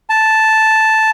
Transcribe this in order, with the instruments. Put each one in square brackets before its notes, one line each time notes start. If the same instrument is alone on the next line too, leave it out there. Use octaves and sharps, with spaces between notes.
[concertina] A5